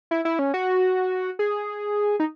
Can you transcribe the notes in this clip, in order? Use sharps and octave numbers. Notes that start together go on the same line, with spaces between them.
E4
E4
C#4
F#4
G#4
D#4